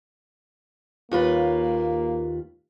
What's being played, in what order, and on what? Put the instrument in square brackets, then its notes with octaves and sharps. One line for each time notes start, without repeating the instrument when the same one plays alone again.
[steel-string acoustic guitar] D#2 F4 B4 [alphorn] A#3